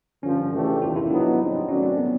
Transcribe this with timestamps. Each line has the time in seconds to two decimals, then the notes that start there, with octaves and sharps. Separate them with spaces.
0.23 G2 D3 F3 C#4
0.53 C#3 E3 A3 D4 G4
0.81 E2 C3 D#3 F4
0.96 E4
1.10 C#3 F#3 B3 D4 D#4
1.39 G3 C4 D#4
1.68 D#3 F#3 A3 C#4 D4 F#4
1.83 C4
1.98 B3